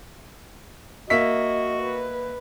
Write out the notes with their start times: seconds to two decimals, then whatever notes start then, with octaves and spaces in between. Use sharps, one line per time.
1.10 A#3 F#4 D#5 E5 B6
1.82 B4